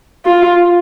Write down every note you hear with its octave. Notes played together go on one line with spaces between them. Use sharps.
F4